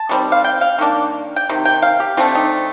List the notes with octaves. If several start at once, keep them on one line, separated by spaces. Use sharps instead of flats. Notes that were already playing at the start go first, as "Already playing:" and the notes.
Already playing: A5
D#3 G3 C4
F5
G5
F5
D#3 A#3 D4
G5
C3 D#3
G5
F5
G4
D3 A3 C4 F4
D#4